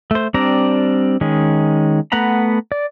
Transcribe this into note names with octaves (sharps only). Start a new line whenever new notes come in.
A3 C5
G3 C4 D4 D5 A#5
D#3 G#3 C#4
A3 B3 F#5 A#5 B5
D5